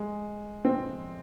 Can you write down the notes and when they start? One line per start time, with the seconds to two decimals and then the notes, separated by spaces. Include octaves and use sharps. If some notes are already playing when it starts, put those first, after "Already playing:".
Already playing: G#3
0.65 C4